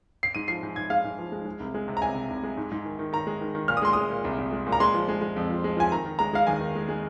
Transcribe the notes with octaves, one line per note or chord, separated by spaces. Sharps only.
C7
G#2 D#7
F3 C7
G#2
G#2 G#6
G#3 F5
G#2
F3
G#3
G#3
C2
G#3
C3
A#5
C2 G#5
C3
C2
G#3
G#2
G#2
D#3
D#3
D#3 A#5
G#3
D#3
D#3
A#2 F6
D#6
G#3 C6
G#3 D#6
A#2
C2
C2
G#3
A#2
A#5
G#3 C6
F3
G#3
G#3
F2
F3
G#3
F3 G#5
D#3 A#5
D#3
G#3 A#5
G#3 F5
D#2 G#5
D#3
G#3
G#3